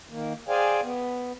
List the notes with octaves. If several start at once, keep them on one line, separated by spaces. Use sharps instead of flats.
D#3 A#3
G#4 C5 D5 F5 G5 G#5
B3